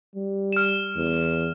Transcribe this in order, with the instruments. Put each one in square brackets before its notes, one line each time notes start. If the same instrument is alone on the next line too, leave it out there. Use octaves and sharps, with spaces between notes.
[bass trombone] G3
[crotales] F6 E7
[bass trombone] E2